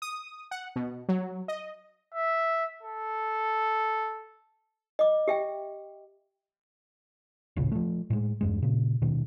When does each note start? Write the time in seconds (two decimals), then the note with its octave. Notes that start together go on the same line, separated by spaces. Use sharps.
0.02 D#6
0.51 F#5
0.76 B2
1.09 F#3
1.48 D#5
2.15 E5
2.83 A4
4.99 D#5 D6
5.28 G4 E5 G5
7.56 D#1 A1 A#2 C#3
7.72 F3 A3
8.10 A2 G#3
8.41 E2 G2 G#3
8.62 A#2 C#3
9.02 D#2 B2 D#3